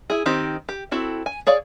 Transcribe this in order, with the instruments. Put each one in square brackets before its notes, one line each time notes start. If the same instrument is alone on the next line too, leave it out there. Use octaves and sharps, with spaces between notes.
[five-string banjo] E4 G#4
D#3 C4 D#4 G4
G4
C4 E4 F#4 A4
G#5
G#4 C#5 D5 F5